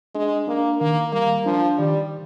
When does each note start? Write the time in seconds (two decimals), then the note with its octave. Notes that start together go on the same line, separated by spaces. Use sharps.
0.15 G#3 D4
0.47 A#3 D4
0.80 D#3 A#3
1.13 G3 A#3
1.46 F3 D4
1.78 D#3 G3